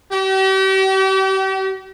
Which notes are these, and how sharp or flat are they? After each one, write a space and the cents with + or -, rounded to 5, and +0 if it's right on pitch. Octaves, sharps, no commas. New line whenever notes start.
G4 -40